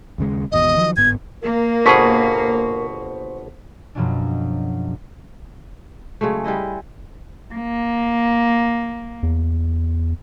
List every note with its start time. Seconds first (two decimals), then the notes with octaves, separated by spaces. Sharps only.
0.18 D#2 C#3 G#3
0.52 G#1 E2 B2 D#5
0.76 D#3 F3 F#3
0.96 G1 G#2 B3 G#6
1.42 A#3 A#4
1.86 G1 B2 G#4 C5 C#6 B6
3.95 F#2 B2 F3 F#3 G#3 D4
6.21 C#3 F#3 G#3 A3
6.44 G3 G#3 E4 D#5
7.54 A#3
9.23 E2